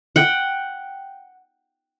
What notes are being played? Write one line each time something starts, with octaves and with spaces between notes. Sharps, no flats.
F#5 G5